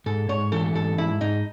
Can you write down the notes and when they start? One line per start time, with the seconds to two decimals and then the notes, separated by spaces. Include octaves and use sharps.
0.06 G#2 A4
0.29 G#2 C#5
0.52 E3 A4
0.75 G#2 A4
0.98 G#2 E4
1.21 G#2 D#4